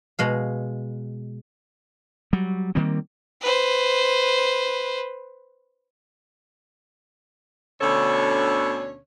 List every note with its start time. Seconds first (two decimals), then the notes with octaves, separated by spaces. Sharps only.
0.19 B2 G#3 F5
2.33 F#3 G3
2.75 D#3 G3 A#3 C4
3.41 B4 C5
7.81 D2 B2 D3 C#4 A4 C#5